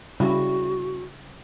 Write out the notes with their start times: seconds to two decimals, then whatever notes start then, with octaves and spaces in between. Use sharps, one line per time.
0.20 C#3 G3 E4 F#4